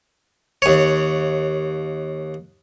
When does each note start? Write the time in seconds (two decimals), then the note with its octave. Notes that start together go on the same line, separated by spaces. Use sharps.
0.62 D#2 C#5